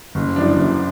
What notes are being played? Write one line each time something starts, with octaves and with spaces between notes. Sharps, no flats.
F#1
F#2 E3 D4
F#1